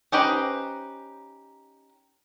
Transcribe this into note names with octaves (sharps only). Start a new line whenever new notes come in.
C#4 D#4 G4 B4 C5